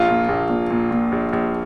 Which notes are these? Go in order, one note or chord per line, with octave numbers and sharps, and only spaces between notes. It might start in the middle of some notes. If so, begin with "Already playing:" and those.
Already playing: A#1 F4
A#2
A#1
A#2
A#2
A#2
A#1
A#1